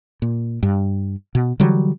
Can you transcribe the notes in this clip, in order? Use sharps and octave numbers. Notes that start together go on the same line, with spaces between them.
A#2
G2
B2
D3 E3 F#3 G3